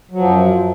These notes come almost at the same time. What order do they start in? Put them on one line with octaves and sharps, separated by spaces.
F#3 F3 F#2